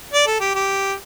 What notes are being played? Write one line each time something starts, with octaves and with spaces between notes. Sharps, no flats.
D5
A4
G4
G4